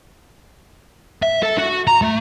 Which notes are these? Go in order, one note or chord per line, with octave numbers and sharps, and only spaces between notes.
E5
A4
F#4
A#5
A3